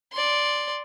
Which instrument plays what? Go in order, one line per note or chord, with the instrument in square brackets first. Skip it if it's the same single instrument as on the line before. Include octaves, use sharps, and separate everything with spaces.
[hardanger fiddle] D5 C6